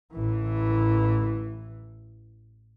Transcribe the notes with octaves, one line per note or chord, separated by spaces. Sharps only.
A1 E3